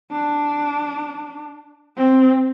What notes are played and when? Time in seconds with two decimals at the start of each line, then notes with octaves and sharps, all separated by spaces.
0.11 D4
1.97 C4